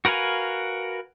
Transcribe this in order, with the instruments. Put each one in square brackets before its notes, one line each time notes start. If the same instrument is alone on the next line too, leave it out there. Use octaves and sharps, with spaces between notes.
[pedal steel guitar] F#4 A#4 B4 F5 G#5